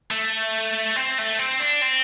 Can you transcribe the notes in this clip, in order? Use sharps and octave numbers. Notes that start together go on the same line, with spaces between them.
A3
C4
A3
C4
D4
C4